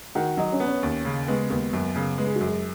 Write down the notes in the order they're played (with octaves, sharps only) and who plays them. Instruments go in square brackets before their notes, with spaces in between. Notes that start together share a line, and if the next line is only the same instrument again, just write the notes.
[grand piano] D#3 [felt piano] F#4 F#5
[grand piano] F#3 [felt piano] D#4 D#5
[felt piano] C#4 C#5
[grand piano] B3
[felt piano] C#4 C#5
[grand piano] D#2
C#3
[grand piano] G#3 [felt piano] B3 B4
[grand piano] D#2 [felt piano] B3 B4
[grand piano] F#2
C#3
[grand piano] G#3 [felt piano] B4
[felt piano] G#4
F#4
[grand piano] F#2 [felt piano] G#4